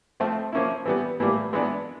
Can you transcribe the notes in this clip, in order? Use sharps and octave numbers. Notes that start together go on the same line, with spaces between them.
F3 A3 C4
F3 A#3 C#4 E4
E3 G3 B3
A2 E3 G3 A#3
E3 G#3 B3 D4